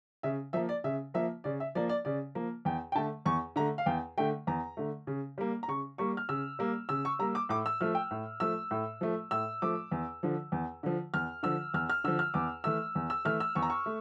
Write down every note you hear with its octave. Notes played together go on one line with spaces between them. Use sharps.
C#3 E5
F3 A#3 E5
D5
C#3 E5
F3 A#3 E5
C#3 D5
E5
F3 A#3 D5
D5
C#3 D5
F3 A#3
E2 G5
G5
D3 A3 A5
E2 C#6
D3 A3 A#5
F5
E2 G5
D3 A3 G5
E2 A#5
D3 A3
C#3
G3 A#3
A#5
C#3 C#6
G3 A#3 C#6
F6
C#3 E6
G3 A#3
C#3 E6
C#6
G3 A#3 A#5
D6
A2 D6
E6
F3 A3 F6
G5
A2
F3 A3 E6
A2
F3 A3
A2 E6
F3 A3 D6
E2
D3 F3
E2
D3 F3
E2 F6
D3 F3 E6
E2 F6
F6
D3 F3 E6
F6
E2 D6
E3 A3 E6
E2
E6
E3 A3 F6
E6
E2 C#6
A#5
C#6
A3